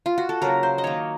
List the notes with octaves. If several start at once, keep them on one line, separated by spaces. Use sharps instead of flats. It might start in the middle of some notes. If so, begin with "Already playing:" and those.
F4
F#4
A4
C#3 F#3 A#3 A#4
C5
D#5
D#3 A#3 C#5